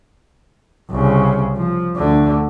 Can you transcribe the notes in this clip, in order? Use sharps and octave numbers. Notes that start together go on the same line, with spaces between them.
C2 C#3
F3
D2 D3